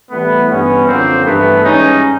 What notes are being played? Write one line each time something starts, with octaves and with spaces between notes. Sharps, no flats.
A2 E3 G3 A3 B3
G2 E3 G3 B3 C#4
F#2 D3 F3 A#3 C4
G2 E3 G3 A3 B3
G#2 E3 G3 C#4 D#4